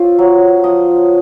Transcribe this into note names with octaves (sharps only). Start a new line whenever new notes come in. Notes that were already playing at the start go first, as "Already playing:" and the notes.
Already playing: C4 F4 C#5
F#3
F3 D#5